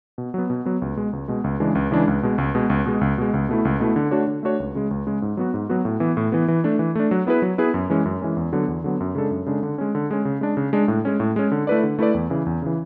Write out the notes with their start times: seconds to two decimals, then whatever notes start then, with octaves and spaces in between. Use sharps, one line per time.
0.18 B2
0.34 F#3 B3
0.50 B2
0.66 F#3 B3
0.82 C#2
0.97 B2 G#3
1.13 C#2
1.28 B2 G#3
1.44 C#2
1.60 C#3 E3 G#3 D4
1.75 C#2
1.91 C#3 E3 G#3 D4
2.08 C#2
2.23 B2 G#3
2.38 C#2
2.55 B2 G#3
2.70 C#2
2.86 B2 G#3
3.01 C#2
3.18 B2 G#3
3.34 C#2
3.49 B2 A3 E4
3.65 C#2
3.80 B2 A3 E4
3.96 D3
4.11 A3 D4 F#4 C#5
4.27 D3
4.43 A3 D4 F#4 C#5
4.60 C#2
4.75 C#3 G#3
4.91 C#2
5.07 C#3 G#3
5.22 G#2
5.37 F#3 B3 F#4
5.54 G#2
5.69 F#3 B3 F#4
5.85 A2
6.00 E3 B3
6.17 A2
6.32 E3 B3
6.48 E3
6.64 A3 D4
6.79 E3
6.95 A3 D4
7.11 F#3
7.27 B3 E4 G#4 B4
7.42 F#3
7.58 B3 E4 G#4 B4
7.74 F#2
7.90 E3 G#3 C#4
8.05 F#2
8.22 E3 G#3 C#4
8.36 E2
8.53 D3 F#3 B3
8.68 E2
8.84 D3 F#3 B3
9.00 F#2
9.15 C#3 G#3 D4 A4
9.31 F#2
9.46 C#3 G#3 D4 A4
9.63 D3
9.78 G#3 C#4
9.95 D3
10.11 G#3 C#4
10.25 C#3
10.41 G#3 D4
10.57 C#3
10.73 G#3 D4
10.88 A2
11.05 G#3 C#4
11.20 A2
11.36 G#3 C#4
11.52 D3
11.67 A3 E4 B4 D5
11.83 D3
11.99 A3 E4 B4 D5
12.14 E2
12.30 C#3 E3
12.46 E2
12.62 C#3 E3